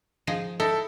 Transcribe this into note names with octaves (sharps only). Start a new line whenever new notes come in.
F3 D#4 G#4
D#4 E4 A4